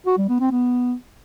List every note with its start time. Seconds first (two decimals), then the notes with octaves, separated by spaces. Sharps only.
0.06 F#4
0.18 G3
0.29 B3
0.40 C4
0.51 B3